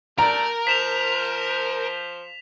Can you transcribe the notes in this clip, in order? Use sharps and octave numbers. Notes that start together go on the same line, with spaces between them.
A3 G4 A#4 D5 A#5
F3 C5 B6 E7 F7